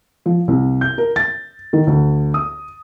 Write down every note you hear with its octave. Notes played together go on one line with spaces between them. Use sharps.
F3
C2
G6
A#4
A6
D#3
D2
D#6